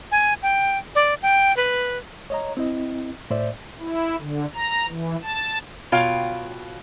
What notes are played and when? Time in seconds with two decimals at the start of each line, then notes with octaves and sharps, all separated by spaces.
0.12 G#5
0.43 G5
0.95 D5
1.22 G5
1.57 B4
2.30 C#5 D#5 A#5
2.57 C4 E4 D#5
3.30 A2 C5 D5 E5
3.80 E4
4.18 D3
4.55 A#5
4.88 E3
5.23 A5
5.92 B2 F4 C#5 F5 G5